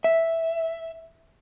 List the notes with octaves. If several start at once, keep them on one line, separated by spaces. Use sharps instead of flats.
E5